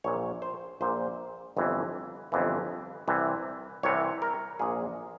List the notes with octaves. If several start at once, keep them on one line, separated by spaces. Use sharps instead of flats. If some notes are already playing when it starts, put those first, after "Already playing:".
A#1 A#2 C#5
C5
A#1 A#2 C5
G1 F2 E3
G1 F2 E3
C2 C3 E3
C2 C3 E3 C#5
A#4
A#1 A#2 G#4